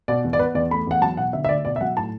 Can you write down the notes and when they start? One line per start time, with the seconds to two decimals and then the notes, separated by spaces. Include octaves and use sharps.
0.08 B2 D5
0.24 E2
0.33 D5
0.39 B3 B4
0.55 E2 D5
0.71 A3 B5
0.87 E2 F#5
1.02 F#3 A5
1.17 B2 F#5
1.33 D3 E5
1.45 E5
1.49 D2 D5
1.65 B2 D5
1.76 E5
1.81 F#3 F#5
1.96 A2 A5